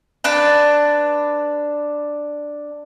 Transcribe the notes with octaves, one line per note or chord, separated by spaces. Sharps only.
D4 B4 A5